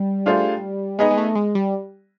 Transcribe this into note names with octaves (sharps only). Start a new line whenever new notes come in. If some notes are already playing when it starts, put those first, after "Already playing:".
Already playing: G3
A3 D4 F4 G#4 C5
G#3 B3 D#4 G#4 B4 D#5
G#3
A3
G#3
G3